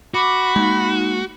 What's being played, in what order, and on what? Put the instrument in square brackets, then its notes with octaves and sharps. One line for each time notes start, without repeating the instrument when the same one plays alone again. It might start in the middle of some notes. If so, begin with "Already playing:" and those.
[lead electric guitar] F#4 [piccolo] B5 [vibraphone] D6
[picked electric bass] G#3 A#3 [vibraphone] D#4